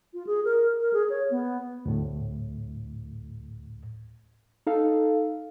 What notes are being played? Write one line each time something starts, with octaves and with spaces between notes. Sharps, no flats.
F4
G#4
A#4
A#4
G#4
C#5
B3
D2 A2
D#4 A4 F5